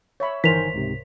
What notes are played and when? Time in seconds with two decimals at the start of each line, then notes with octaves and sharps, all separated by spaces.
0.20 C#5 E5 B5
0.44 G1 D#3 E3 A#4 C5 G#5 B6 F7
0.74 C#2 G#2 C3